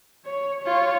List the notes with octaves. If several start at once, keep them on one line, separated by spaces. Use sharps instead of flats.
C#5
F4 C#5